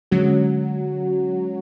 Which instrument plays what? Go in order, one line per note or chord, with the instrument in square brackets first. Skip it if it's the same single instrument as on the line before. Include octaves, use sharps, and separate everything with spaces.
[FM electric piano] D3 G#3 C#4 F#4 [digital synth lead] F#3